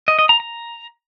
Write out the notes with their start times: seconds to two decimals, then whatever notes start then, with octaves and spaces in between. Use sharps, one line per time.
0.08 D#5
0.19 D#5
0.29 A#5
0.40 A#5